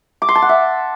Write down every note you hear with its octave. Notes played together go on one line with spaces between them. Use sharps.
D6
C6
A5
F#5
E5